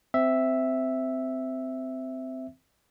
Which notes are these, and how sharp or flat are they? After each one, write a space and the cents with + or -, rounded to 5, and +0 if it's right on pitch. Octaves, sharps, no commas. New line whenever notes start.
C4 -15 E5 +0